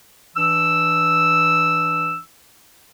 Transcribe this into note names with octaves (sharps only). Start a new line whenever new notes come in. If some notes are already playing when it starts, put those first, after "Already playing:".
E3 D4 E6